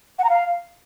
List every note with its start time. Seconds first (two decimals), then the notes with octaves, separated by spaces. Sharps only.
0.19 F#5
0.24 A#5
0.30 F5